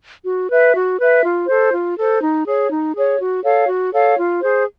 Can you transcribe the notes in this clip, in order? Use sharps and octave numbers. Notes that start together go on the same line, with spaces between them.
F#4
B4 E5
F#4
B4 E5
F4
A4 C5
F4
A4 C5
D#4
G#4 C#5
D#4
G#4 C#5
F#4
A4 C#5 F5
F#4
A4 C#5 F5
F4
G#4 C5